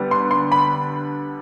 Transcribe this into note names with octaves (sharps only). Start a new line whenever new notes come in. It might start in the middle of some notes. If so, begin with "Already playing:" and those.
Already playing: D3 G3 B3
C6
C6
B5